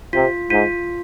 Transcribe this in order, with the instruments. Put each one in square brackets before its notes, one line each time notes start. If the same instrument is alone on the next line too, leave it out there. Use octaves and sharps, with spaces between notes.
[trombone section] C3 [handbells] F4
[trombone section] G#2 [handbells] F4